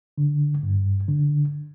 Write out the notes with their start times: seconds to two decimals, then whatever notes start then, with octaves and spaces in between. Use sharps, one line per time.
0.18 D3
0.63 G2
1.08 D3